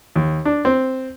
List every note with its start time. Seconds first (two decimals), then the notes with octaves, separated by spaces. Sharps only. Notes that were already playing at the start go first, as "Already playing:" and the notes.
0.16 D#2
0.45 D4
0.65 C4